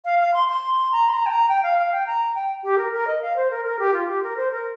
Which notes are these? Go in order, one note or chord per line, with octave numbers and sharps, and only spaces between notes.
F5
F5
C6
C6
A#5
C6
A#5
G5
A#5
G5
F5
F5
G5
A#5
G5
G4
A#4
A#4
D#5
F5
C5
A#4
A#4
G4
F4
G4
A#4
C5
A#4